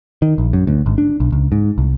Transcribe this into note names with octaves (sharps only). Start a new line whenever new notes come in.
D#3
A#1
F#2
D2
G#1
D4
B1
C#2
G#2
C2